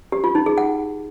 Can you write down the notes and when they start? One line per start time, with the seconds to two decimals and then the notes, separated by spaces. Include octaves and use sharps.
0.12 G4
0.24 F4
0.35 D#4
0.46 G#4
0.58 F#5